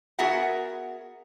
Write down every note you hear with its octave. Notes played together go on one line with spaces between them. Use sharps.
B3 F#4 G#4 A#4 E5 F#5